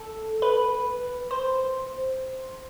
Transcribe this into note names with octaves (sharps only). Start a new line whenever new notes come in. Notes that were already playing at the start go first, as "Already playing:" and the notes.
Already playing: A4
B4
C5